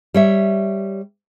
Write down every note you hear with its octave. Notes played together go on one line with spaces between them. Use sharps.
G3 C#5 E5